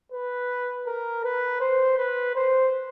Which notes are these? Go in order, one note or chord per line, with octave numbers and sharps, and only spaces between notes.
B4
A#4
B4
C5
B4
C5